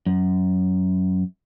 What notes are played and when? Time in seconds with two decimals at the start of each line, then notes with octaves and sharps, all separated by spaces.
0.06 F#2